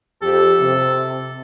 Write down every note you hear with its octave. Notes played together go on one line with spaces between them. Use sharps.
F2 G4 A4
C3